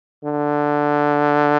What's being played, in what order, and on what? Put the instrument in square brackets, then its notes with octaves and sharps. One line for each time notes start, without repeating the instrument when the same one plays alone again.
[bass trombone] D3